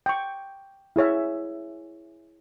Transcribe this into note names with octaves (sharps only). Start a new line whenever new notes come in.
G5 C#6
E4 G#4 C#5 E5